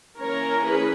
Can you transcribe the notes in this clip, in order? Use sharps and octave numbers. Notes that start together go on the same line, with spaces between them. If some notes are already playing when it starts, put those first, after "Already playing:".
E3 A#3 C#4 A#4 C#5
G#4 B4